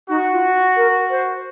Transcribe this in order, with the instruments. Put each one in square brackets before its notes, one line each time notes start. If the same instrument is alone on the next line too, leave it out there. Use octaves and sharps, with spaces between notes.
[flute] D#4 [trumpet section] F#4
[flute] F4
A#4
C5